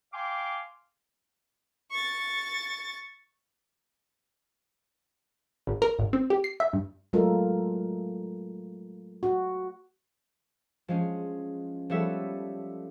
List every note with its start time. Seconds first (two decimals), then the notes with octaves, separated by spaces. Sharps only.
0.13 F5 G5 G#5 C6 D6
1.91 C#6 A6
5.67 G#1
5.82 A#4
5.99 G#1
6.13 C4
6.30 G4
6.44 C7
6.60 E5
6.73 G2
7.13 F#3 G#3 A3 F4 A4 A#4
9.23 F#4
10.88 F3 G#3 C#4
11.90 F3 G3 B3 A4 C#5 E5